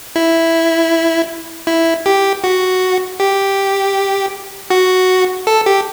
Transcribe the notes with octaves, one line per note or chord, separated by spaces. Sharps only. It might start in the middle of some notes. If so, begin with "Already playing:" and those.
E4
E4
G4
F#4
G4
F#4
A4
G4